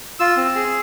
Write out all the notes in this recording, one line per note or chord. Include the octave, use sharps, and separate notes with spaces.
F4 E6
C4
G#4